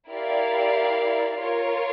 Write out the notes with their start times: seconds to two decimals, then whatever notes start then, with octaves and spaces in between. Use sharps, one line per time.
0.11 E4 G4 A#4 D5 F5
1.42 F4 A#4 C#5